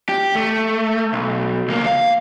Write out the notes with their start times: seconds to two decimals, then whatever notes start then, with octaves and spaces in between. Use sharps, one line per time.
0.09 G4
0.35 A3
1.13 B1
1.68 C#2 A#3
1.86 F5